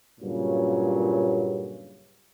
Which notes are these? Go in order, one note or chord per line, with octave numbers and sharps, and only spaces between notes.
G2 A#2 C#3 F#3